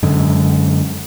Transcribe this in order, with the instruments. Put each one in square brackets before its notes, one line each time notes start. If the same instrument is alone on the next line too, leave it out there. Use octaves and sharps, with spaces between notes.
[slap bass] F#2 D3 G#3